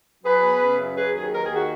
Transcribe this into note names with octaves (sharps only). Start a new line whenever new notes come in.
F#3 G#4 B4
B3
C#3
F#2
F#3 G#4 B4
D#2 G#4
D#3 A#4
G#4
D#2 F#4